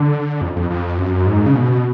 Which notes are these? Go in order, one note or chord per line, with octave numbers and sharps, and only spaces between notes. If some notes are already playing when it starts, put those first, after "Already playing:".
Already playing: D3
F2
F2
F2
F#2
G#2
C#3
B2